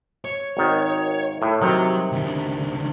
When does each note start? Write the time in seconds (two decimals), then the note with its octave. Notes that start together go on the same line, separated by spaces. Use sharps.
0.25 C#5
0.57 G#1 D#3
1.42 A2
1.62 C3 D#3 F#3
2.12 C#2 D3